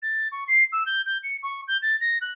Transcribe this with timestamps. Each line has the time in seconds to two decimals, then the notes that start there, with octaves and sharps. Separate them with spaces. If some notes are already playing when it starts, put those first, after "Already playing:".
0.02 A6
0.32 C#6
0.48 C7
0.72 E6
0.86 G6
1.06 G6
1.23 C#7
1.43 C#6
1.68 G6
1.82 A6
2.01 A#6
2.21 F#6